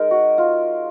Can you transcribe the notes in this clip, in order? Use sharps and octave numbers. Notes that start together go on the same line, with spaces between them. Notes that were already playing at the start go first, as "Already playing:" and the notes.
Already playing: G#3 D#4 A#4
F#4
F4